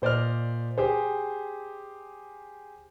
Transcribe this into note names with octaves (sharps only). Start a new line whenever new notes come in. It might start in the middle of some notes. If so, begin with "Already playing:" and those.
A#2 C5 D5 D#5 F6
G4 G#4 C5